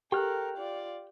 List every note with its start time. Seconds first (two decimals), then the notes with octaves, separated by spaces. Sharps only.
0.12 G4 A4 A#4 G5 F6 F#6
0.57 F4 D5